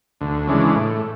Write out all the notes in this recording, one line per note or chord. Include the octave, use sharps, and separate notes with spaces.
D2
C#3 E3 G#3 D4
A2